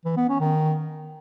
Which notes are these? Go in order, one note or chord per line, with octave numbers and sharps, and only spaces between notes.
E3
B3
C#4
D#3